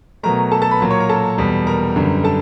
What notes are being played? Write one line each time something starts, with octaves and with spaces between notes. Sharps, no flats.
B2 F#3 A3 A#4 A#5
A4 A5
A4 A5
B4 B5
A#2 F#3 A#3
C#5 C#6
A#4 A#5
A4 A5
E2 B2 G3 B3
A#4 A#5
F#2 D3 G3 B3
A4 A5